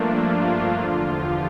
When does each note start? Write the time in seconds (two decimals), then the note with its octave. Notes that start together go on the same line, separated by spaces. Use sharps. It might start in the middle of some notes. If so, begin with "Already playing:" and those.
Already playing: G2 F3 A3 A#3 D4 F4
0.32 F4
0.75 E2 D3 F3 F4
1.19 G4